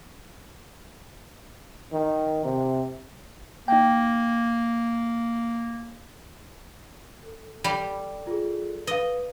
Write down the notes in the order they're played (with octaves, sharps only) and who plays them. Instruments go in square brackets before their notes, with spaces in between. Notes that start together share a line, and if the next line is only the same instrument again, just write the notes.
[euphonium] D#3
C3
[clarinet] A#3 [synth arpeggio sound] D#4 G5
[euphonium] A4
[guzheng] G3
[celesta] F4 G#4
[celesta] B4 F5 [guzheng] D#5